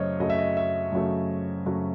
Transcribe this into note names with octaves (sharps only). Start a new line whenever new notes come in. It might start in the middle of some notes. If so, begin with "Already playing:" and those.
Already playing: F#2 C#3 F#3 A3 C5 C#5 D#5
F#2 C#3 F#3 A3 D#5
E5
D#5
E5
F#2 C#3 F#3 A3
F#2 C#3 F#3 A3